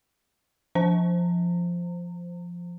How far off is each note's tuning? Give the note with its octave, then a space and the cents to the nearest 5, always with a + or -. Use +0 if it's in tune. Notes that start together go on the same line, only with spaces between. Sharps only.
F3 +0 C5 +0 A#5 -35